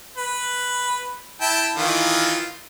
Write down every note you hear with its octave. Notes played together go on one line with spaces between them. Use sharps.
B4
E4 G5 A5
D#3 E3 F4